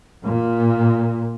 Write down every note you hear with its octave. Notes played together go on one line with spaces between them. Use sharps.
A#2